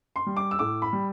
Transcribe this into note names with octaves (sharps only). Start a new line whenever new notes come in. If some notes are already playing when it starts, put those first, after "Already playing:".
C6
G3
D6
E6
A2 D6
B5
G3